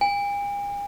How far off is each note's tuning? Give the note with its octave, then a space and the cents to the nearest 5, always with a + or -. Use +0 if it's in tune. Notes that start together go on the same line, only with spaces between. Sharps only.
G#5 -45